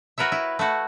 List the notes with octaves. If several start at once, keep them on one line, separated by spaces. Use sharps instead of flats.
F#4 A#4 B4 C#5 E5
E4
A3 E4 F#4